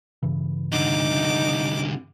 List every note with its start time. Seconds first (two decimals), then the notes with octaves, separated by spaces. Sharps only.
0.23 G2 C#3 E3
0.72 C2 D3 D#4 D6